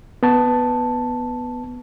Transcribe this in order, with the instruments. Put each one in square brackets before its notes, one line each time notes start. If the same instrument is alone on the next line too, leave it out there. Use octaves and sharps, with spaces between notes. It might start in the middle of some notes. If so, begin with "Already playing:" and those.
[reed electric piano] B3 A5